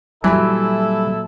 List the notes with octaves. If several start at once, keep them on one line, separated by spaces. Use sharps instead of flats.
A#2 E3 F#3 G3 E4 A4